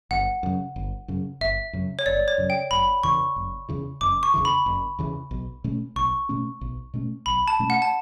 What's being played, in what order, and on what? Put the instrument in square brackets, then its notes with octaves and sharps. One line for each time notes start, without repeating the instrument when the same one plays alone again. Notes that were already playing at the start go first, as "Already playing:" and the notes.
[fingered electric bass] G1 [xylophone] F#5
[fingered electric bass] F#2 C#3
G1
F#2 C#3
[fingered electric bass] G1 [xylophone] E5
[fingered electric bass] F#2 C#3
[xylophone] C#5
[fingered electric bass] G1 [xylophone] D5
[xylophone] C#5
[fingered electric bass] F#2 C#3
[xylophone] G5
[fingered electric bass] F#1 [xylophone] B5
[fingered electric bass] E2 C#3 E3 [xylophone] C#6
[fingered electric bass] F#1
E2 C#3 E3
[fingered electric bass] F#1 [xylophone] D6
[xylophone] C#6
[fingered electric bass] E2 C#3 E3
[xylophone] B5
[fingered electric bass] F#1
E2 C#3 E3
B1
B2 A3 C#4
[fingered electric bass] B1 [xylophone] C#6
[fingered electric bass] B2 A3 C#4
B1
B2 A3 C#4
[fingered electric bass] B1 [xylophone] B5
[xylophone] A5
[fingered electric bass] B2 A3 C#4
[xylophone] F#5
A5